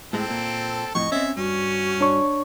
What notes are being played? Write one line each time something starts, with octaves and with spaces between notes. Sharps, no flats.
A2 G#3 C4 A4
A#2
F2 A2 D#5 C#6
C4 C#4 E5
G2 C#4 F#4
D4 C#5 C#6